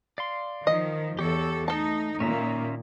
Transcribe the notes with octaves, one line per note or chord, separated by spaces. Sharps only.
D5 F5 C6
D#3 F3 D#5
E2 G4 A4 C#5
A3 D#4 A4 A5
A#2 D#3 A#3 C#4 E5 A#5